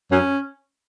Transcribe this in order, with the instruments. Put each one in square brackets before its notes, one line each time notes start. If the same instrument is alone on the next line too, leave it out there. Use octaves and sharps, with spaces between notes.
[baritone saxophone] F#2 [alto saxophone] C#4